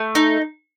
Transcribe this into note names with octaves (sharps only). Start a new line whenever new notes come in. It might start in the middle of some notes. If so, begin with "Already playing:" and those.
Already playing: A3
D#4